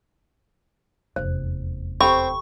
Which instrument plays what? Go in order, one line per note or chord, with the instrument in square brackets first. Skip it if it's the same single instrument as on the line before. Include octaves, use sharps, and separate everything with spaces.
[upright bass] F1 E2 [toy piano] C5
[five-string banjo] C4 [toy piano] G4 A4 B5 [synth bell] C#6